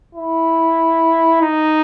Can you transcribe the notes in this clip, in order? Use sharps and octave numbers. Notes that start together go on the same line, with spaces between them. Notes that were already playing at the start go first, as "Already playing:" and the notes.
E4
D#4